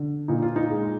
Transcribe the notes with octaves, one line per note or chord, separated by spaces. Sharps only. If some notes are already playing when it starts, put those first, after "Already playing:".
Already playing: D3
A#2 D#4
F4
D#4
G#3